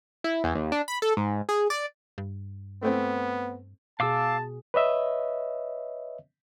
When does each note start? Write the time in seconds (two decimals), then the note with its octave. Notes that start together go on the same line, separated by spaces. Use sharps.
0.24 E4
0.44 E2
0.55 D#2
0.72 D4
0.88 B5
1.02 A4
1.17 G#2
1.49 G#4
1.70 D5
2.18 G2
2.83 A3 B3 C4
4.00 B2 G#4 F5 A5 D6 E6
4.74 B4 C#5 D#5 E5